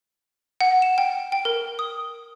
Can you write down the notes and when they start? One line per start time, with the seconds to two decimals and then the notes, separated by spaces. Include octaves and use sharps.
0.61 F#5
0.82 E7
0.98 G5
1.32 G5
1.45 A#4
1.79 D#6